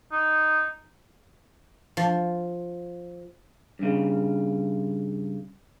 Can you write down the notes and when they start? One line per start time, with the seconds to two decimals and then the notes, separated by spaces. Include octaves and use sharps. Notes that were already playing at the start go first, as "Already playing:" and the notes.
0.12 D#4
1.97 F3
3.79 G2 C#3